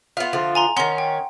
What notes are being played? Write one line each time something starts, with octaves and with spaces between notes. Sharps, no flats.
B3 F4 E5
D3 F3 F4
G#5 A#5 C6
D#3 C#4 F#5 C6
G5